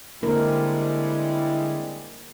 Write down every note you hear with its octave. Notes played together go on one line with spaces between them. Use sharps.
D3 G3 G#3 A#3 C4 E4 A#4